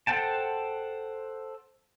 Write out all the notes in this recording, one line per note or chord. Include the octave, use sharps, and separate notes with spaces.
A4 C5 F#5 G5 A5